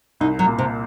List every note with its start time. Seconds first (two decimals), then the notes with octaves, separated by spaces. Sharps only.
0.21 C2 D#4
0.39 F#3
0.46 A#2
0.58 C3